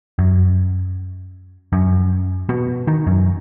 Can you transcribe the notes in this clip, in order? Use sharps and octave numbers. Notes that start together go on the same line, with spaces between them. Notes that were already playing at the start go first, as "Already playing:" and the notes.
F#2
F#2
B2
D#3
F#2